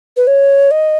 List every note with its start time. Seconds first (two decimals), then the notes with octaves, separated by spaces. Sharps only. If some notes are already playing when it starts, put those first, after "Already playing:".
0.17 B4
0.27 C#5
0.71 D#5